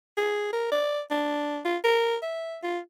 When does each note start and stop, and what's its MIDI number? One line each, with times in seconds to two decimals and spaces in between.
0.17 0.52 68
0.53 0.71 70
0.71 1.01 74
1.11 1.59 62
1.65 1.77 65
1.84 2.16 70
2.22 2.58 76
2.63 2.79 65